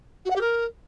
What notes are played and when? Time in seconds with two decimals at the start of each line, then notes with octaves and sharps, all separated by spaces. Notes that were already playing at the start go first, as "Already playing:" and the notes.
0.25 F#4
0.30 F#5
0.35 G4
0.40 A#4